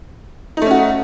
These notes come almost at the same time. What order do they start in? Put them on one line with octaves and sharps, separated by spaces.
D#4 A3 C#4 F#4